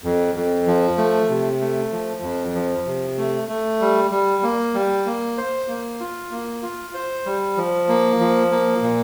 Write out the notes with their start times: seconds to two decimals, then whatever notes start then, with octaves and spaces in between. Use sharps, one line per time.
0.04 F2
0.35 F2
0.67 F3
0.97 A3
1.30 C3
1.61 A3
1.92 F3
2.23 F2
2.55 F3
2.86 C3
3.18 A3
3.49 A3
3.81 G3
4.11 G3
4.43 A#3
4.74 G3
5.06 A#3
5.38 C5
5.68 A#3
6.00 F4
6.31 A#3
6.63 F4
6.94 C5
7.26 G3
7.57 F3
7.89 A#3
8.19 F3
8.51 A#3
8.82 A#2